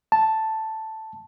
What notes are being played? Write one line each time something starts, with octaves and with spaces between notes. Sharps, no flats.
A5